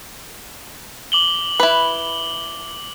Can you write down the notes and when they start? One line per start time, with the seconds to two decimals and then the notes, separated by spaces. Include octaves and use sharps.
1.12 D6 F#7 G7
1.60 E4 B4